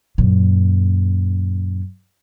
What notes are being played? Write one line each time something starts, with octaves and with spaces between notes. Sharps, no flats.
F#2 A#2